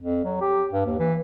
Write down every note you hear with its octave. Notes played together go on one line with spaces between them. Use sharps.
F2
F#3
G4
G2
D#2
E3